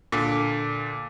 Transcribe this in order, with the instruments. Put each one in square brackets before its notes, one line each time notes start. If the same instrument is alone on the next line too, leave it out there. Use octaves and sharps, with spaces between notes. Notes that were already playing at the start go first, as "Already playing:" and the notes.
[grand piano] A#2 D3